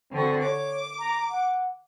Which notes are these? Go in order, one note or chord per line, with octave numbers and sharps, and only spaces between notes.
D3 C4 F#4
C#5 D6
A#5
F#5